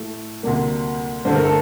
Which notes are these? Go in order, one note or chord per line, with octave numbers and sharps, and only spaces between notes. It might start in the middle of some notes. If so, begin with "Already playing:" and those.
Already playing: A2 A3
D2 C3 G3 A#3
G2 D3 A3 C5
A#4
A4